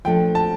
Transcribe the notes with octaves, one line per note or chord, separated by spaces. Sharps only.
A#2 F3 A3 D4 G5
A5